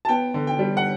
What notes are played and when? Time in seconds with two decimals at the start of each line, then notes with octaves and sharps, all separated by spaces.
0.05 A5
0.09 B3 G5
0.34 D3
0.47 G5
0.59 G3
0.77 F#5